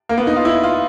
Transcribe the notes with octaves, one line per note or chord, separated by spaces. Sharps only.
A#3
B3
D#4
F4
E4
F4